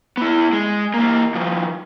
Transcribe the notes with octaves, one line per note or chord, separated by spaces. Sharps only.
B3 E4
G#3
E3 A#3
D#3 F3